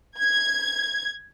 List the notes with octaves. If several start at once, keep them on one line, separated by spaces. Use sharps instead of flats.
G#6